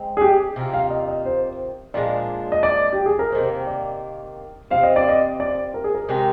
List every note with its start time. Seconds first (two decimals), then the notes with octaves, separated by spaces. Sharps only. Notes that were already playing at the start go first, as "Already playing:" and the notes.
Already playing: G#3 C4 D#4
0.17 G#4
0.21 G4
0.56 C3 D#3 A#3 F4
0.73 F5
0.90 D#5
1.08 D#5
1.26 C5
1.94 A#2 F3 G#3 D4 D5
2.52 D#5
2.63 D5
2.93 G4
3.06 G#4
3.19 A#4
3.32 C3 D#3 A#3 C5
3.67 D5
4.71 C3 F3 C4 F5
4.83 D#5
4.96 D5
5.09 D#5
5.40 D5
5.74 A#4
5.84 G#4
5.94 A#4
6.09 C3 D#3 G#3 D#4